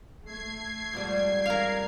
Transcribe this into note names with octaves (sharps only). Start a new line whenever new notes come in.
A3 G#6 C7
F2 G#2 G3
A#4 F5